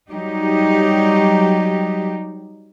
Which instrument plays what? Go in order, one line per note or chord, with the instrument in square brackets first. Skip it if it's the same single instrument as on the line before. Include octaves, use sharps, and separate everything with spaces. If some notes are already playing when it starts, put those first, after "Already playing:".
[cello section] F#3 G3 D#4 G4